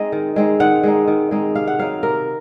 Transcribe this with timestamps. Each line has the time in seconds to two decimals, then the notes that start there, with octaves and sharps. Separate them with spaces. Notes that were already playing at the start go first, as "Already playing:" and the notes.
Already playing: G#3 C4 D#4 D#5
0.12 D#3
0.36 G#3 C4 D#4
0.60 D#3 F#5
0.83 G#3 C4 D#4
1.08 D#3
1.31 G#3 C4 D#4
1.55 C3 F5
1.68 F#5
1.79 F#3 C4 D#4 F5
2.03 C3 A#4